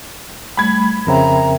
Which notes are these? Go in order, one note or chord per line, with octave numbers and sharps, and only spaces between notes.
G3 A3 B5 G#6
F2 C#3 C4 A#4 E5 G5 A#5